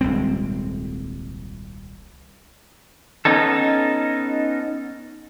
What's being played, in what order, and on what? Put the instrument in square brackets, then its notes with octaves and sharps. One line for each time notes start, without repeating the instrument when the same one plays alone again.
[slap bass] D#1 C2 G#3 C4
[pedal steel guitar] B3 C#4 D#4 A4